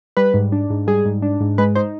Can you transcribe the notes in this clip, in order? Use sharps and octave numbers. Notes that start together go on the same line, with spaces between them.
G3 B4
G#2
D4
G#2
G3 G#4
G#2
D4
G#2
G#3 B4
D#4 C5